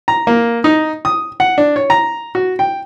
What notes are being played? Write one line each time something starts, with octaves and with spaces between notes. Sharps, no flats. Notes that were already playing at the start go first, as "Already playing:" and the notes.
A#5
A#3
D#4
D#6
F#5
D4
C#5
A#5
F#4
G5